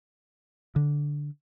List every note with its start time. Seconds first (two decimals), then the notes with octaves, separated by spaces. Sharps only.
0.76 D3